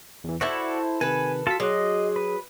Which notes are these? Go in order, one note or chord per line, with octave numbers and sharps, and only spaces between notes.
E2 E3
E4 F#4 A4 C5 D5 E5 C#6
C3 D#3 A4 B4 G#5
F4 F#4 A4 F5 A5 B6
F#3 G#4 D#5 C6 D6 F#6
B4